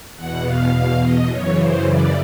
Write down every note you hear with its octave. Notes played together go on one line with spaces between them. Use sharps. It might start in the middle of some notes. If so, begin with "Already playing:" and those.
E2 B2 F#5
F5
F5
D#5
F#2 C#3 E3 C#5
C5
D5